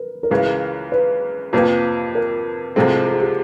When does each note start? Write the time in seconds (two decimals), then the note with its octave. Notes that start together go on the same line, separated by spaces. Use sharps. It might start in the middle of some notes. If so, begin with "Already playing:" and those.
Already playing: A#4 B4
0.23 A#4
0.30 C#2 C#3 E3 G#3 B4
0.92 B4
1.53 F2 C3 F3 A#3 B4
2.15 A#4
2.76 C2 C3 F3 G#3 C4 A4
3.07 A4
3.14 G#4
3.21 G4